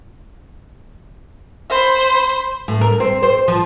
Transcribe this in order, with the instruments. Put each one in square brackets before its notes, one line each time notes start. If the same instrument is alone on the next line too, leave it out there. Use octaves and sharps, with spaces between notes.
[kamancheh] C5 B5
[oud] A2
A#4
C4
C5
F3